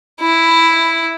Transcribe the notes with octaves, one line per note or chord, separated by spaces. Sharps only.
E4